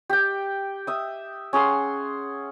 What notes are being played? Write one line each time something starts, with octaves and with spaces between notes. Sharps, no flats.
G4 G5
E5 D#6
C#4 G#4 F#5 C6